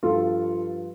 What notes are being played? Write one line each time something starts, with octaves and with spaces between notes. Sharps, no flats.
G2 F3 F4 A4